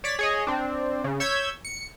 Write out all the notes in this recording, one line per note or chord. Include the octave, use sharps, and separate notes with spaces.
C#5 D5 A6 B6
G#4 C#5 D#5
C4 D4
C#3
C#5 E6 G6 G#6 B6
C#7